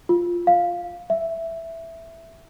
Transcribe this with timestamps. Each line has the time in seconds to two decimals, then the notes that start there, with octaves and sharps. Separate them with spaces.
0.09 F4
0.47 F5
1.10 E5